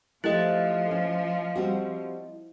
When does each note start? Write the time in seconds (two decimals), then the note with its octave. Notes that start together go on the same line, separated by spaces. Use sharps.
0.24 F3 A3 E4 G4 A4 D#5
0.91 C#4
1.56 G3 C4 F#4